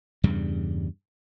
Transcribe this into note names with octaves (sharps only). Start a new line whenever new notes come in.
E2 G2 C#3 G3